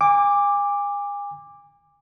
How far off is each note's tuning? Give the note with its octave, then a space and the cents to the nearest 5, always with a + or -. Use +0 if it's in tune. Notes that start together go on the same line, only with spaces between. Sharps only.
G#5 -35 D6 +0